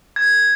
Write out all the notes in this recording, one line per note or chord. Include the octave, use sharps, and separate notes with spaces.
G#6